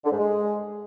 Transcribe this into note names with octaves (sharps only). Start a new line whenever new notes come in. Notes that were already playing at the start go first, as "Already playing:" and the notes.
D3
G#2
G#3